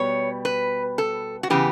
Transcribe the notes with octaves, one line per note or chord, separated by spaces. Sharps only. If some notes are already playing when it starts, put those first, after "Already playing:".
Already playing: B2 G3 B3 C#5
B4
A4
F#4
C#3 E3 B3 G4